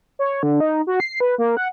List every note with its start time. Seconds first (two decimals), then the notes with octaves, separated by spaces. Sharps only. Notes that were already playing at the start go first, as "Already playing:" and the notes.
0.19 C#5
0.43 D3
0.60 D#4
0.87 F#4
1.00 C7
1.20 B4
1.38 A#3
1.57 F#5